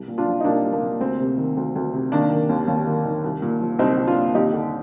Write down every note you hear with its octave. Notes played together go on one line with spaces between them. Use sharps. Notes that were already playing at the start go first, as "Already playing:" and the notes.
Already playing: C2
A#2
D4 F4
F3
D#4
C2 A#3 D4
C2
A#3
A#2
D2 C4
C3
D#3
D2
D2
C3
D#3 A#3 D4
D#3
D#2
D#2
D#3
D#3
C2
A#2
F3
C2 C4 D#4
C2
D4 F4
A#2
D#2 D#4 G4
D3